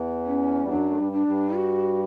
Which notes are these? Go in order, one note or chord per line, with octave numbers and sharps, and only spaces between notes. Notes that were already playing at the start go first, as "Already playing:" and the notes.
Already playing: E2 E3
C#4
G3
F#2 F#3 D4
A3
G2 G3
D4
G2 G3
F#4